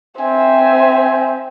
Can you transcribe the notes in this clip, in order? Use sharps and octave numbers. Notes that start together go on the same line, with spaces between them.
C4 E5 G#5